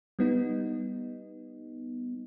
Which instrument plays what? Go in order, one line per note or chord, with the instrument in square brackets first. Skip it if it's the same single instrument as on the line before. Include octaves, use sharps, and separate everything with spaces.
[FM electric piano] G3 B3 D#4